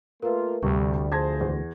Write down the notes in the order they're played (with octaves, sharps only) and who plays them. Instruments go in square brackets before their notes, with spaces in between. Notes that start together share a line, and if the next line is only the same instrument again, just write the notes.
[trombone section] A3 A#3 F4 [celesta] A#4 B4
[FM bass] D2 [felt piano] G2 C3 [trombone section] G3 [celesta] C#6
[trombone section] F3 G#4 C5 [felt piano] A5 G#6 A#6 [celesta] D6
[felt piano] E2